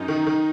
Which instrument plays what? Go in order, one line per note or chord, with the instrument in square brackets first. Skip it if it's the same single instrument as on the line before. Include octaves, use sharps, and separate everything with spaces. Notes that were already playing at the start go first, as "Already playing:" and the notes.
Already playing: [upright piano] F#2 [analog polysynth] D#4
[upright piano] D#3
D#3